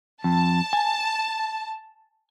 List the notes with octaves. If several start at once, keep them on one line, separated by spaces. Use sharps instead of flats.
F2 A5
G#5